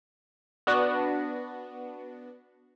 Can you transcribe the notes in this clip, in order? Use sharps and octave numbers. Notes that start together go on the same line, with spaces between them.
B3 D4 F#4